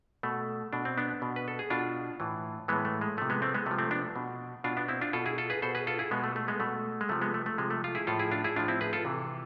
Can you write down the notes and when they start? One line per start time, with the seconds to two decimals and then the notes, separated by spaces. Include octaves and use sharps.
0.23 B2 A3
0.73 B2 D4
0.85 C4
0.98 B3 D4
1.22 B2
1.36 B4
1.48 A4
1.59 G#4
1.70 B2 D4 F4
2.20 A2 E3
2.68 A2 E3 G#3 B3
2.85 A3
3.01 G#3
3.17 C3 F3 A3
3.30 G#3 B3
3.42 A3 C4
3.54 G#3 B3
3.66 C3 A3
3.71 F3
3.78 A3 C4
3.91 B3 D4
4.16 B2
4.64 B2 D4 F4
4.77 B3 D4
4.88 C4 E4
5.01 D4 F4
5.13 B2 F4 A4
5.26 E4 G#4
5.38 F4 A4
5.50 G#4 B4
5.62 B2 A4 C5
5.75 G#4 B4
5.87 F4 A4
5.99 E4 G#4
6.11 B2 G#3 B3
6.24 A3
6.36 A3
6.48 G#3 B3
6.60 B2 A3
7.01 G#3
7.09 C3 F3 A3
7.21 G#3 B3
7.34 A3
7.46 A3
7.58 C3 F3 G#3
7.70 A3
7.84 F4
7.95 E4 G#4
8.07 A2 F3 F4 A4
8.19 E4 G#4
8.31 D4 F4
8.44 E4 G#4
8.56 A2 F3 D4 F4
8.68 C4 E4
8.81 G#4 B4
8.93 F4 A4
9.05 C3 E3